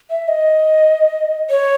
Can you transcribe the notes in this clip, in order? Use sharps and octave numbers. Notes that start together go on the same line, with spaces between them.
E5
D#5
C#5